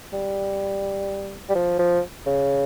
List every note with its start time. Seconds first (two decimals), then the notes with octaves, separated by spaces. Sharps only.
0.13 G3
1.49 G3
1.55 F3
1.79 F3
2.27 C#3